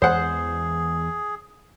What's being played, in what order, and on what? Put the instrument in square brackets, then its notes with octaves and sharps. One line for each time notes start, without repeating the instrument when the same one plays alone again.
[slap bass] E2 E3 G#3 [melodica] G#4 [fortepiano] C5 F#5